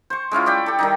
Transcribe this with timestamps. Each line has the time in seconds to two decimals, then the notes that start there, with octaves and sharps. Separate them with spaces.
0.10 C5 C#6
0.32 G#3 C#4 E4 F4
0.46 D5 E5 G5 C#6
0.66 G4 A4
0.79 D#3 G3 D#4